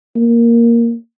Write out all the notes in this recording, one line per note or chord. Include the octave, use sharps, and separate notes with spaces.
A#3